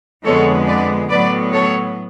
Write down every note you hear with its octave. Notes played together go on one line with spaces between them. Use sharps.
F2 D3 G#3 B3 A4 C#5
B4 D5
A2 F#3 B3 B4 D5
A4 C#5